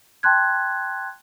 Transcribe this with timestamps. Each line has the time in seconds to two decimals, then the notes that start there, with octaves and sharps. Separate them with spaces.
0.23 G5 A5 C6 F#6 G#6